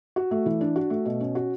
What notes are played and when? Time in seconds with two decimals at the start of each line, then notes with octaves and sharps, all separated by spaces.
0.16 F#4
0.31 A3
0.46 E3
0.61 D4
0.76 F#4
0.90 A3
1.06 B2
1.21 C#4
1.35 F#4